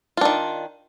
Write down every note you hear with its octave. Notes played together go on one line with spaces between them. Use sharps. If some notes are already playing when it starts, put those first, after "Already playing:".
D#3 D4 F4